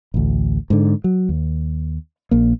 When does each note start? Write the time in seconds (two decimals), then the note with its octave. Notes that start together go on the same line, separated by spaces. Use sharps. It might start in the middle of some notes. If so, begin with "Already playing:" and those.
0.14 A1 D2
0.70 G#2 D3
1.04 F#3
1.29 D#2
2.31 A#1 A#3